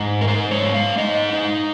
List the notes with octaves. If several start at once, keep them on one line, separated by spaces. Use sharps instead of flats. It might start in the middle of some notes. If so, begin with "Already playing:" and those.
Already playing: G#2 D#4
A#4
G#3 C5
C#5
G#3
F5
D#4 D#5
D#4